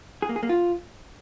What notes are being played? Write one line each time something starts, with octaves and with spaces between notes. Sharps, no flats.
G#4
A#3
G#4
A#3
F4